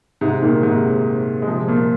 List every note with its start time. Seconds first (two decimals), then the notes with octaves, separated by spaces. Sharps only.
0.21 G#2 C3
0.42 A#2 D#3
0.63 G#2 C3
1.42 G#3
1.47 C3 F3
1.68 A#2